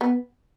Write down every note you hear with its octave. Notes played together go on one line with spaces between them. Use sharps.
B3